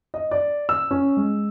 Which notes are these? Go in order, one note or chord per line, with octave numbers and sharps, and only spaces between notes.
D#5
D5
E6
C#4
G#3